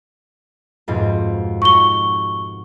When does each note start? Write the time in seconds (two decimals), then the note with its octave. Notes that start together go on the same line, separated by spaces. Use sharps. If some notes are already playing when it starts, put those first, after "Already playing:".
0.88 F2 G#2 B2
1.62 D#4 F#4 C#6 G7